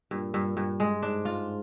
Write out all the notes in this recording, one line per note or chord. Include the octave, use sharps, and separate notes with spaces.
G2 A#2
G2
G2
G#3
G#2 D4
F4